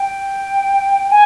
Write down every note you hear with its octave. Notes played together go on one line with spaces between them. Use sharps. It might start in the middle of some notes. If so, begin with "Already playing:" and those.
Already playing: G5
G#5